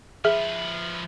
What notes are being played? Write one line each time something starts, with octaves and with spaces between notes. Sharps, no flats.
F3 G#4 B4 E5